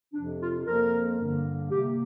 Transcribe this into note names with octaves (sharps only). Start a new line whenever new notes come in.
F2 C3 F3 D4
F4
F2 F3 A#3 A#4
G2 D3 G3 A#3
C3 A#3 G4